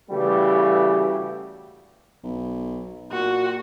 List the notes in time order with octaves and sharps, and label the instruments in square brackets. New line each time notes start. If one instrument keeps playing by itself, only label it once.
[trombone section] C#3 E3 G3 A3 F#4 G4
[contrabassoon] B1
[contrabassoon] A#2 [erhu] F#4